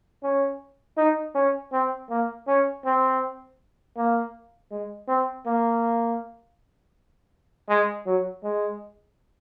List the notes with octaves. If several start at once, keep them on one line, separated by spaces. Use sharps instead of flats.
C#4
D#4
C#4
C4
A#3
C#4
C4
A#3
G#3
C4
A#3
G#3
F#3
G#3